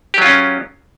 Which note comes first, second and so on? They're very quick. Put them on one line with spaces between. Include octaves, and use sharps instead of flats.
G4 F#3 F4 C#4